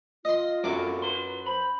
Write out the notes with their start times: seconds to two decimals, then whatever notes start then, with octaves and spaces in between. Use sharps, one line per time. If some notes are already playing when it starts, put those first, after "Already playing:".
0.25 F4 D#5 C6
0.64 F#2 A2 C3 A3 D6
1.02 B4 C6
1.46 C5 B5